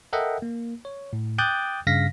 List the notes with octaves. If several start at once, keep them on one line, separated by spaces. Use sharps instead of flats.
A4 A#4 D#5 E5 F#5 G5
A#3
C#5
A2
G5 D6 D#6 F#6 G6 A6
G2 C#3 F5 A#6 B6